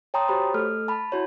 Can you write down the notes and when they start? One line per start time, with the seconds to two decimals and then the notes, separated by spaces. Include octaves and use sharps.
0.14 C#5 G5 A5 A#5 C6 D#6
0.28 F#4 G4 C5 C#5 B5
0.54 A3 A4 F6
0.88 A5 B5
1.12 E4 F#4 C#5